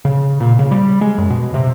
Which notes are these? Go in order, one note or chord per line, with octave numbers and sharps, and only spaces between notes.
C#3
A#2
C#3
G3
G#3
F#2
B2
C3